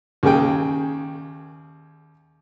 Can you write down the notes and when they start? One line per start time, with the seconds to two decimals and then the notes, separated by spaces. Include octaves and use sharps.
0.23 D#2 C#3 G#4 G5